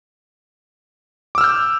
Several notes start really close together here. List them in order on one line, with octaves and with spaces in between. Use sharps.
D6 E6 F6 G6